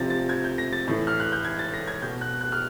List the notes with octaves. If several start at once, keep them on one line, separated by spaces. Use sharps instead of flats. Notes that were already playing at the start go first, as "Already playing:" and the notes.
Already playing: C3 F3 A6 A#6
A6
G#6
G6
A#6
A6
A2 E3
F6
F#6
G6
G#6
A6
A#6
G#6
B2 G6
F#6
F#6
F6